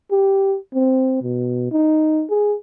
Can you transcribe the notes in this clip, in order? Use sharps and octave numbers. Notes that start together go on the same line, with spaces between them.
G4
C4
B2
D#4
G#4